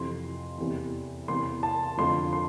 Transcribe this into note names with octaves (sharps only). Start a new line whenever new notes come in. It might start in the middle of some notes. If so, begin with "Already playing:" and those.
Already playing: F2 C3 E3 C6
E2 C3 E3
E2 C3 E3 C6
A5
F2 D3 F3 C6
C6